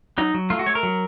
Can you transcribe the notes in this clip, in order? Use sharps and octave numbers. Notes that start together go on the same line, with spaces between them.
F#3 D#4
F#3
A3 F4
F#4
A3 C#5
A#4
F#3